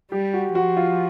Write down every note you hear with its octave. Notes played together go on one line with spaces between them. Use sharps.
G3 G4
F#4
F3 F#4
F4